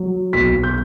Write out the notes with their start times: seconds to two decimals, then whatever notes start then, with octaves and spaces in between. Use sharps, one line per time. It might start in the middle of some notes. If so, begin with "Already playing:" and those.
Already playing: F#3
0.33 B1 B6
0.63 G6